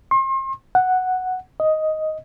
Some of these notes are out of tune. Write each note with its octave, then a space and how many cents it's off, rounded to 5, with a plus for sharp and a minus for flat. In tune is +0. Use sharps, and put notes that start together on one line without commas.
C6 +40
F#5 +0
D#5 +5